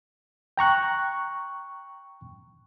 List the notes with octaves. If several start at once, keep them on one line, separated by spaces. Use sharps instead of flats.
G5 A#5 C#6 F#6